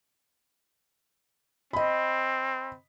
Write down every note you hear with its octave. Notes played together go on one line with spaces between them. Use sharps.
C4 D#5 B5